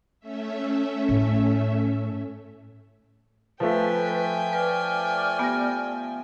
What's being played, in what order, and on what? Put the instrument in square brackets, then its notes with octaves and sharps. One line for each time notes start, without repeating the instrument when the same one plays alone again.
[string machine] A3 C#4 E5
[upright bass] A2
[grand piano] F3 A3 [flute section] B4 [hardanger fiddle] G5 G#5
[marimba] B4 [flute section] D5 F6
[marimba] B3 G4 A#6